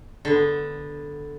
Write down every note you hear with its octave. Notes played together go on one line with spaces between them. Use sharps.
D3 B3